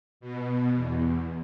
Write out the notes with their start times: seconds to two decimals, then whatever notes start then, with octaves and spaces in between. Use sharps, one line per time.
0.20 B2
0.74 E2